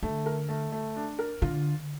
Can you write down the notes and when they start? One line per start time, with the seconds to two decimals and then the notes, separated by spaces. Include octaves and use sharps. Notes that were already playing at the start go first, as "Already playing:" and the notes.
0.03 D3 A3
0.26 A#4
0.48 A3
0.72 A3
0.96 D4
1.19 A#4
1.42 D3 F4